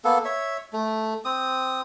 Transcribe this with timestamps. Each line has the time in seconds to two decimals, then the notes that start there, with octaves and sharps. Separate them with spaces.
0.04 A#3 B3 A4
0.25 C#5 E5
0.73 A3
1.25 C4 D#6